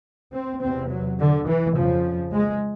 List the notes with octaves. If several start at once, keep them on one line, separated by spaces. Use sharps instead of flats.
C4
E2 C3 C4
F#3
D3
E3
F2 C#3 F3
G#3